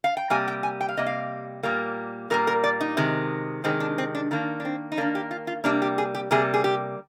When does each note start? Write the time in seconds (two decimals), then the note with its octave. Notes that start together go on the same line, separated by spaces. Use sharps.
0.04 F5
0.17 G5
0.30 C3 G3 A#3 G#5
0.48 G5
0.63 G#5
0.81 G5
0.89 F5
0.97 C3 G3 A#3 D#5
1.07 F5
1.63 A#2 G3 A#3
2.30 A#2 G3 A#3 A#4
2.47 A#4
2.64 D5
2.81 D#4
2.97 C3 D#3 G#3
3.64 C3 D#3 G#3 C4
3.80 D4
3.98 C4
4.15 D4
4.31 D#3 A#3 D4
4.60 D4
4.65 C4
4.92 D#4
4.97 D#3 A#3 D4
5.15 G4
5.31 F4
5.47 F4
5.64 C3 G3 A#3 D4
5.82 G4
5.98 G#4
6.15 G4
6.31 C3 G3 A#3 G#4
6.54 G#4
6.64 G4